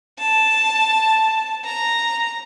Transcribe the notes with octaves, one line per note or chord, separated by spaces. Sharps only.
A5
A#5